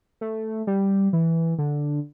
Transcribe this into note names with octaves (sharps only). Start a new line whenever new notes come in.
A3
G3
E3
D3